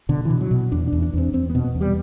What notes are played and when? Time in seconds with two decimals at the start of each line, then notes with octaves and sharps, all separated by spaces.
0.09 B2 D3
0.25 E3
0.30 B2
0.41 F#3
0.51 B2
0.72 E2 D4
0.87 D4
0.92 E2
1.02 D4
1.13 E2 C4
1.33 E2 C4
1.50 B3
1.55 B2
1.64 B3
1.75 E2
1.81 G3